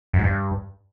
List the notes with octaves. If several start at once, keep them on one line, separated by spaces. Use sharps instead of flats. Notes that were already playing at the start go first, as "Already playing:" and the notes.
F#2
G#2
G2